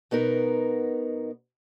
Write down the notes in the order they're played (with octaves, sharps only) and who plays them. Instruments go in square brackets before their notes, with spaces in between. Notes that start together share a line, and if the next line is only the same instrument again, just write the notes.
[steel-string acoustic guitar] B2 B3 D#4 A#4